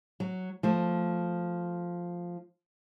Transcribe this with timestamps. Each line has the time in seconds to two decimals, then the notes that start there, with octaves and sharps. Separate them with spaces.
0.20 F#3
0.63 F3 A3